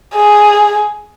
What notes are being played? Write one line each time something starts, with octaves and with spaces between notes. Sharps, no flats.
G#4